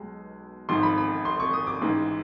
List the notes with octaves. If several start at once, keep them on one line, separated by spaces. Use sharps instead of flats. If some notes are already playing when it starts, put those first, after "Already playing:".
Already playing: B1 B2 G#3
G#1 G#2 F3 C6
B5
B5
C6
C#6
D#6
D6
A1 G#2 E3 G#3